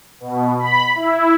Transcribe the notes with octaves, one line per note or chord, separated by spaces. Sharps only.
B2
B5
E4